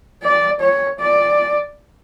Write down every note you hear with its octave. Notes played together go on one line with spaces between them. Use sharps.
D5
C#5
D5